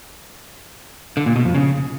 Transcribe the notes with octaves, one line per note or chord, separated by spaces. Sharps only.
D3
A#2
B2
F2
C#3